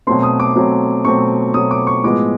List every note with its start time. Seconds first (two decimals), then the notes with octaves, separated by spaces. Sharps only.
0.07 B2 F#3 A3 C4 C6
0.23 D#6
0.40 D6
0.55 B2 F#3 A3 C4
1.05 B2 F#3 A3 C4 C#6
1.54 B2 F#3 A3 C4 D#6
1.71 D6
1.87 C#6
2.04 A2 F3 G#3 B3 D6